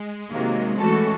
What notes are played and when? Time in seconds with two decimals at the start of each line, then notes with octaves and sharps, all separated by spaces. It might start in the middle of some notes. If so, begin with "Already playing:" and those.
Already playing: G#3
0.31 C3 D#3 F#3 A#3
0.79 E3 G#3 A3 C#4 F#4 A4